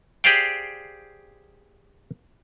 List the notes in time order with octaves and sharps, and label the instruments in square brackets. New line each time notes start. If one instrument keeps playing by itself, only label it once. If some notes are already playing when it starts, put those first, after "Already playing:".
[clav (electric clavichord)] G4 G#4 C5 D5 F5 G5